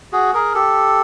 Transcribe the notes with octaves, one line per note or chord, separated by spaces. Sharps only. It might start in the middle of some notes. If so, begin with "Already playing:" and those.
F#4 G#4
G#4 A#4
G4 A4